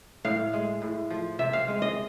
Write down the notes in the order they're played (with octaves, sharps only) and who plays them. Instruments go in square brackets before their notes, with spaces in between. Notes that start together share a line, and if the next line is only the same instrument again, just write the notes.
[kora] A2 F5
G#3
A2
F3
C3 E5
F5
G#3
D#5